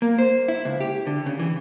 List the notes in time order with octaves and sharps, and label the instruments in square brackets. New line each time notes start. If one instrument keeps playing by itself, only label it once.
[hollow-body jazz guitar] A#3
C5
E4
C#2
G4
D3
C#3
E3